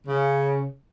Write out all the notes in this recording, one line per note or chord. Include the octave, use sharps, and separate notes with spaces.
C#3